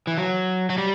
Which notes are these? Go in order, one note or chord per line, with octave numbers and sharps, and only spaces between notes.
E3
F#3
F#3
G3